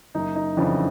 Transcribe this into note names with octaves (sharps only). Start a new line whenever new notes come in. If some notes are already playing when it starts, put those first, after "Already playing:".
F#1 D#4
D#4
F2 C#3 E3 D4